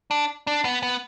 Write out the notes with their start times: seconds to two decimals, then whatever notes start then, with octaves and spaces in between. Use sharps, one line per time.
0.11 D4
0.47 D4
0.65 B3
0.83 B3